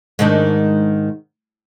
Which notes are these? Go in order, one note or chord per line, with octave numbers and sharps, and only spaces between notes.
G#2 D#3 D4